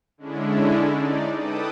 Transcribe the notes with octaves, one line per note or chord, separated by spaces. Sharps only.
D3 G#3 C#4 D4 E4
D#4 D5
A4 B4 G5 A5 D6 D#6